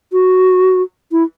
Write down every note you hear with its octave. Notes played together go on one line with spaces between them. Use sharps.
F#4
E4